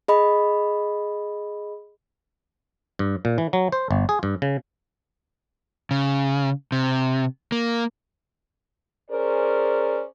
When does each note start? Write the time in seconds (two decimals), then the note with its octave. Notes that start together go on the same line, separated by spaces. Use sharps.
0.08 G#4 D#5 B5
2.99 G2
3.25 A#2
3.38 E3
3.53 F#3
3.72 C5
3.91 G1
4.09 G#4
4.23 G2
4.42 C#3
5.91 C#3
6.72 C3
7.52 A#3
9.11 C#4 G#4 A#4 C5 D5